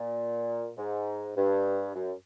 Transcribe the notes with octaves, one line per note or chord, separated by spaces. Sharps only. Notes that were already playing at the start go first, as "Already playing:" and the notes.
Already playing: A#2
G#2
G2
F#2